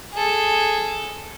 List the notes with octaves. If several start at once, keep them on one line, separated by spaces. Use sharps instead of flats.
G#4 A4